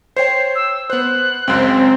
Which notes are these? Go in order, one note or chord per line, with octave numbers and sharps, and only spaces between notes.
C5 C#5 G5 C7
E6
B3 C5 F#6
C#2 F#2 C4